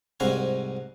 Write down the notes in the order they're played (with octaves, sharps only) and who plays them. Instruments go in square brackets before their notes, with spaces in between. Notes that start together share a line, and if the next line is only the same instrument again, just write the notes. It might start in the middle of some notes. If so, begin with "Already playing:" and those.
[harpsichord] C2 G#2 C4 F#4 F5 G#5